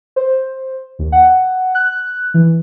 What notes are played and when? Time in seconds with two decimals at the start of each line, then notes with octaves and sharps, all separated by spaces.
0.16 C5
0.99 D#2
1.12 F#5
1.75 F#6
2.34 E3